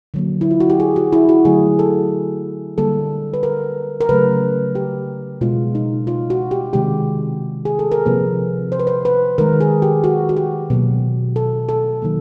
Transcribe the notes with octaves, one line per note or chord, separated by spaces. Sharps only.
D3 F#3 A#3
E4
F4
F#4
G4
G#4
F#4
E4
F#4
D3 F#3 A3 G#4
A4
D3 G3 A#3 A4
B4
A#4
A#4
C#3 F#3 A3 B4
G4
B2 G#3 F4
D#4
F4
F#4
G4
C3 D#3 G#3 G4
G#4
A4
A#4
C3 F3 A#3 B4
C5
B4
C5
B4
D#3 G#3 A#4
G#4
G4
F#4
F#4
G4
B2 F#3 A#3
A4
A4
D#3 F#3 A#3